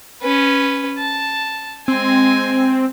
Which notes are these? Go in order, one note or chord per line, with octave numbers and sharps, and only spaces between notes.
C#4 B4
A5
G#3 C4 G#5